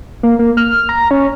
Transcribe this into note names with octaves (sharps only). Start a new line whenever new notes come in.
A#3
A#3
F6
A#5
C#4